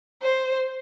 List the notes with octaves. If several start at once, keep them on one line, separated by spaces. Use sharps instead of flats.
C5